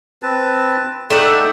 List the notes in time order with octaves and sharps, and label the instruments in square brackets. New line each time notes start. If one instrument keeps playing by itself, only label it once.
[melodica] C4 B4 A5
[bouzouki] A3 E5 F#5 [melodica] D#4 D5 G5